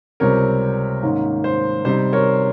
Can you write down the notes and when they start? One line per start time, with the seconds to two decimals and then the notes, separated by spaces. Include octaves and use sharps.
0.20 C#2 C3 G3 C4 A#4 C#5
1.03 G#2 D#3 A#3 C#4
1.44 C5
1.85 C3 G3 C4 D#4 C5
2.13 A#4 C#5